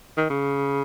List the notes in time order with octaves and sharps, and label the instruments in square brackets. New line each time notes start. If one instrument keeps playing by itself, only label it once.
[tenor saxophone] D#3
C#3